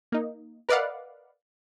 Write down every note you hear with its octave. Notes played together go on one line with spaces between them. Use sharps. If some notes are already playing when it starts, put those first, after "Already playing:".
A#3 D#4
A#4 B4 D5 D#5 F5 F#5